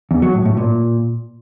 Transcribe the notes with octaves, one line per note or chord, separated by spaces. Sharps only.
E2
F#3
A2
A2
A#2